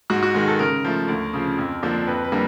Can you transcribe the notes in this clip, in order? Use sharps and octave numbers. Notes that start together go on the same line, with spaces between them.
G#2 F#4
F#4
D#3 G#3
A4
C#3 A#4
F3 A3
D2
C#3 F3
F2
D3 F3 A#3 D4
F2 B4
B4
D3 G3 A#3